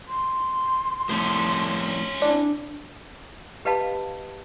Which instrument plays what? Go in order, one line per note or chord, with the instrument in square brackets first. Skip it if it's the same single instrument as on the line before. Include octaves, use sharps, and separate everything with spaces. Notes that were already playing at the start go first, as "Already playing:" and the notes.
[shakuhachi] C6
[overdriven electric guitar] F2 A2 [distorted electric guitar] C#4 C5
[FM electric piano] D4 [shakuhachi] E4
[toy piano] G4 B4 D#5 F5 A5 B5